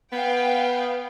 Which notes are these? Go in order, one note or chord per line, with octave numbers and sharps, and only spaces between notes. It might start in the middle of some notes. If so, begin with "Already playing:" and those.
B3 B4 F5 G5